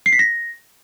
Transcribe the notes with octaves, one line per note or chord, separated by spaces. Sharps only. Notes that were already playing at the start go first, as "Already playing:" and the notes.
C7
B6
A#6